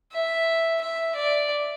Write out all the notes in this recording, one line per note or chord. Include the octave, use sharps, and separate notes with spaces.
E5
E5
D5